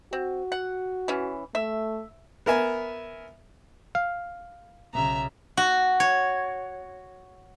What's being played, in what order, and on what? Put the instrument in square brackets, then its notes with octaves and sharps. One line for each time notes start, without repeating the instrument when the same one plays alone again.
[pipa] C4 [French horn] F#4
[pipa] F#5
E3 C#4
[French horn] A3 [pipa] E5
[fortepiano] B3 A#4 E5 G#5
[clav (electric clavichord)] F5
[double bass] B1 C#3 [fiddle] E5 A#5
[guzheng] F#4
C#5